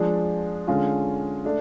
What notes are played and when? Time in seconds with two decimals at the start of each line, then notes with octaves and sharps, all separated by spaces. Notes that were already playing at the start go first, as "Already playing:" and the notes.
Already playing: F3 G#3 D4
0.67 D3 G#3 C#4 F4
1.45 A3 D4